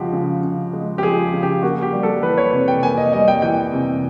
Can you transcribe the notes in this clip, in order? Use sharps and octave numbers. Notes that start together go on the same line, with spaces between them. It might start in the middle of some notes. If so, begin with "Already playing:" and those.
Already playing: C#3 F3 G#3 F#4 G4
C#3
C#3
G#3
G4
F3 G#4
C#3
G4
A#3 F#4
G4
G3
A4
E3 B4
C#5
C3
G5
A#3 G#5
D#5
G3 D#5
G5
E3 G5
C3